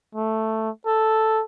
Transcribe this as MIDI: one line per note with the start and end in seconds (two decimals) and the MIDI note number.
0.15 0.70 57
0.86 1.43 69